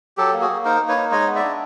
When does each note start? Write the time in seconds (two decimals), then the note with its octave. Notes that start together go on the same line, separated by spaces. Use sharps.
0.17 F#3 G4 A4
0.33 A#3
0.41 F#4 G#4
0.49 A#3
0.65 D#4 A#4 C5
0.81 A#3
0.89 B4 C#5
0.97 D#4
1.11 G#3 C#5 D#5
1.27 B3
1.36 D5 E5
1.44 D4